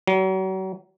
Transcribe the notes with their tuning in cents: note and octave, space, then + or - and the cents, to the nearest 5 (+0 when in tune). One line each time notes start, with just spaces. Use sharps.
F#3 +40